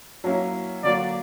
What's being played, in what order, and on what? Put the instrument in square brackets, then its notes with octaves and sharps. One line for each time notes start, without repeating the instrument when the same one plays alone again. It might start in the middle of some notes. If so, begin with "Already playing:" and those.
[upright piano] F#3 A#3 C#4 E4
[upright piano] D3 F#3 A#3 [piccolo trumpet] D5